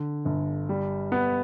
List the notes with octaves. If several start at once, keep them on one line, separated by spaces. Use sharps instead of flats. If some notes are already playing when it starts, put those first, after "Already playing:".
Already playing: D3
G1
G3
B3